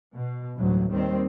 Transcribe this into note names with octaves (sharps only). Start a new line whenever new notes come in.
B2
A1 D2 G2 F#3
D#2 D#3 G3 C4